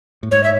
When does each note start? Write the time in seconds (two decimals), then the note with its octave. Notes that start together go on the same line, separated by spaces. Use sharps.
0.23 A2
0.31 G#2 C#5
0.44 E5